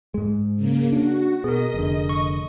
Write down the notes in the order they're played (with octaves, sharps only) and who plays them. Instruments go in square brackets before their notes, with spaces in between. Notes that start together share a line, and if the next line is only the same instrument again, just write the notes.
[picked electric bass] G#2 G#3
[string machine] C#3 A#3
[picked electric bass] D4 [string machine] F#4
[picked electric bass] B2 [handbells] G#4 A#4 [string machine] D#5
[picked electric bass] F1 D3
[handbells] C#6